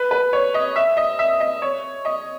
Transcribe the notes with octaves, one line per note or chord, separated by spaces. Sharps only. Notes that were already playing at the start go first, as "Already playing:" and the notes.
Already playing: B4
B4
C#5
D#5
E5
D#5
E5
D#5
C#5
D#5